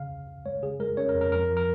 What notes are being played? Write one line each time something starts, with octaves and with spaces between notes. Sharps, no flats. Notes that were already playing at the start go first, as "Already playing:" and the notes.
Already playing: C#3 F5
C#2
C#3
G#3 C#5
C#3 G#4
G#3 A#4
C#4 C#5
A#4
F2
A#4
F2 A#4
F3
A#4